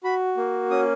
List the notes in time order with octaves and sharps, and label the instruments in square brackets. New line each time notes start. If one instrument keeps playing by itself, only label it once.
[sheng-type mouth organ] F#4 B5
A#3
C#4 D#6